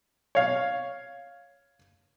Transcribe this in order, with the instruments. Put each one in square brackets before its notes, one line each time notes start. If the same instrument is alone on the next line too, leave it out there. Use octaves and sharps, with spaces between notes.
[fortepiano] C#5 F5